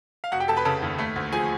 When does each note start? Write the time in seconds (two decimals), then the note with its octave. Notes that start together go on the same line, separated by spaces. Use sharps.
0.24 F5
0.32 F1 F#4 F#5
0.40 G4 G5
0.48 F1 A4 A5
0.57 B4 B5
0.65 C#3 A4 A5
0.82 D#2
0.98 A3
1.16 D2
1.32 F3 G#4 G#5